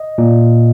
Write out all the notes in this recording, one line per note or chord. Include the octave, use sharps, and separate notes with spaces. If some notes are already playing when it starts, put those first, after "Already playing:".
Already playing: D#5
A#2